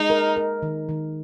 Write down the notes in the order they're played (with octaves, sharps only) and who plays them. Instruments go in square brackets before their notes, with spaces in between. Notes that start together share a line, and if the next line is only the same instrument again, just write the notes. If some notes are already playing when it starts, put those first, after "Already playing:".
Already playing: [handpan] G#3 [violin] D#4
[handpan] A#4
A#4
D#3
D#3